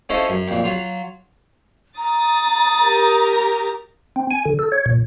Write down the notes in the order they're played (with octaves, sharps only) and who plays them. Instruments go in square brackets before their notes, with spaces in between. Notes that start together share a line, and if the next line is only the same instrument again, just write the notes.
[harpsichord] C#4 E4 F4 A4 C5 D#5
F#2
F2 A#2
F#3 F4
[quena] A#5 [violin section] D#6 A6
[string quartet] G4 A#4 A#6
[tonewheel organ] C4
G#5
D3
A4
C#5
A#2